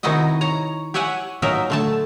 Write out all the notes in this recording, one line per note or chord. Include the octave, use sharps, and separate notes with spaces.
C3 D#3 D#4 E4 F#4 D#5
C#5 A#5
G4 C#5 E5 F#5 G#5
A#2 F#3 D#4 A#4 E5
D3 A3 A5